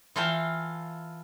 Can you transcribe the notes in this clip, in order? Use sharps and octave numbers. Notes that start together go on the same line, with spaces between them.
E3 F4 A4 F5 G5